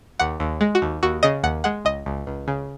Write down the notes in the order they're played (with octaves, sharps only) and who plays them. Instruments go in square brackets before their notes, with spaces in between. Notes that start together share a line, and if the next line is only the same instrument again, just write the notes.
[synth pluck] D#2 F#5
D#2
G#3
F#4
D#2
D#2 F#4
C#3 D#5
D#2 F#5
G#3 F#5
C#2 D#5
C#2
C#2
C#3